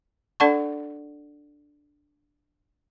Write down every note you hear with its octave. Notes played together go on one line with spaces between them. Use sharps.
D4 A4 D5 F#5 A5 C#6